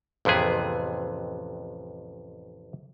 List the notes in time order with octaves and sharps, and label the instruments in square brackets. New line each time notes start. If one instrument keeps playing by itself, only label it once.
[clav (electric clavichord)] A1 F2 C3 B3 G#4